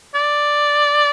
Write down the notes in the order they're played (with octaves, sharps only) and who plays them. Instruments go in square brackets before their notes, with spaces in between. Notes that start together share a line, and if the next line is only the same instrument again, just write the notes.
[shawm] D5